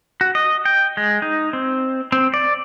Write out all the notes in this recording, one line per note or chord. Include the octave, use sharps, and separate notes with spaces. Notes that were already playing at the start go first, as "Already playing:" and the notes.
F#4
D#5
G5
G#3
D#4
C4
C4
D5